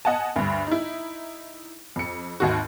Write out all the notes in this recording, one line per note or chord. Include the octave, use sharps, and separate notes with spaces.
D#5 F#5 G#5 A5
D2 G2
D#4 E4
F2 C#7
G#1 D#2 F#4